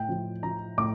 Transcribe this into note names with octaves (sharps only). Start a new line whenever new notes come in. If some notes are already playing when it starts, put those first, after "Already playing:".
Already playing: A2 G5
F3
F3 A#5
A2 D6